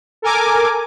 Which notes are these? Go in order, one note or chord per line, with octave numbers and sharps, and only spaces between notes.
A4 A#4 G#5 D6